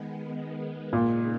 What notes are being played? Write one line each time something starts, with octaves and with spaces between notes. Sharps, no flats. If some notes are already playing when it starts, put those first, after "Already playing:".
Already playing: D#3 G#3 B3
A#2 C#3 G#3 D#4